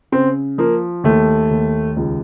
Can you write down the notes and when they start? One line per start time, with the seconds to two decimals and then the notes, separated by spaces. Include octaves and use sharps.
0.12 C#3 C4
0.58 F3 A#3
1.04 D#2 A3
1.50 D#2
1.96 C#2